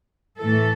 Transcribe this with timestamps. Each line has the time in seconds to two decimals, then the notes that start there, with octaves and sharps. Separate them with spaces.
0.40 A2 E3 A3 A4